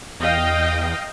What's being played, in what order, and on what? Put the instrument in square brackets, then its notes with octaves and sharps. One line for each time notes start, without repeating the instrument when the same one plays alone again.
[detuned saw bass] E2 [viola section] D#5 F5 G5